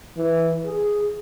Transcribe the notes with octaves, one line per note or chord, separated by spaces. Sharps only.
E3
G#4